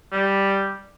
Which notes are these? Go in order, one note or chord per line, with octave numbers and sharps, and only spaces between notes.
G3